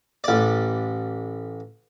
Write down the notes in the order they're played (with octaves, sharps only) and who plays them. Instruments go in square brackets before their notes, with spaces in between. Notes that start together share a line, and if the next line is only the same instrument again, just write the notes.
[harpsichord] A1 D5